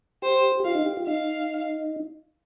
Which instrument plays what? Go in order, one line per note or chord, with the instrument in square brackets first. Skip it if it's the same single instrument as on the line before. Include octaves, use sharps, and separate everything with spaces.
[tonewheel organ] G4 [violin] C5
[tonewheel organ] G4
[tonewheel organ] F4 [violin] F5
[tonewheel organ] D#4
G4
F4
[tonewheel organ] D#4 [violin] F5